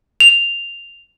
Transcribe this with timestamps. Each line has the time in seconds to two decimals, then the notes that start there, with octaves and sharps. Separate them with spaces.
0.20 F7